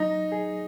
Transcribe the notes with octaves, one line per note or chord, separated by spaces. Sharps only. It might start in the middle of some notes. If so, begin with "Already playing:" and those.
Already playing: F#3 D#4
G#4